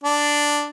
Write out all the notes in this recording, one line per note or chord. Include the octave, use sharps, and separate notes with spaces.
D4